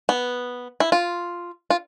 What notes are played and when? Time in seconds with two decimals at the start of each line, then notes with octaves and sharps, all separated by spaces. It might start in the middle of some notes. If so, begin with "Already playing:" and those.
0.09 B3
0.80 E4
0.92 F4
1.70 F4